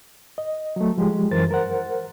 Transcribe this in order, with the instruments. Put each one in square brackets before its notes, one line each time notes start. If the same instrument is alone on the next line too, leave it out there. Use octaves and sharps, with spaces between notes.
[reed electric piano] D#5
F#3 A3
F3 G#3 G4
F#2 E3 A#4 C5 A6
A#4 C5 F#5